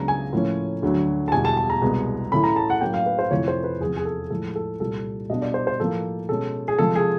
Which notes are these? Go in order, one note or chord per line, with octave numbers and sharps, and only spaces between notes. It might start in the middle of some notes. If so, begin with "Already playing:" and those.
Already playing: C#2 C#3 F#3 B3 D4 A#5
G#5
A2 F3 A#3 C#4
D2 D3 F#3
A5
E2 B2 G3 G#5
A5
A5
A#5
C2 B2 G#3 B3
A2 E3 A3 C#4 B5
A#5
A5
F#5
A2 F#3 A#3 C#4 G5
F5
B4
C5
F2 C3 E3 A3 C#5
C5
B4
E2 C3 F3 G#4
G#4
A4
A2 F3 G#3 A4
A4
C2 A#2 G3 A4
B2 G3 B3 D4 D#5
D5
C5
C5
A2 F3 A#3 A4
B2 G#3 C#4 A4
G#4
C3 F3 G#3 A4
G#4